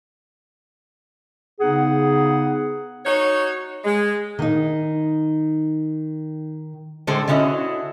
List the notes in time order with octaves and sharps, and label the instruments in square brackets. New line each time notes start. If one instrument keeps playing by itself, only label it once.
[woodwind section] C#3 B3 D#4 G#4 F#5
[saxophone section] D#4 F#4 C#5
G#3
[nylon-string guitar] D#3 D#4
[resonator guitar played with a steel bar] A2 D3 G#3 A4 C5
D3 C#4 E4 F#4 D#5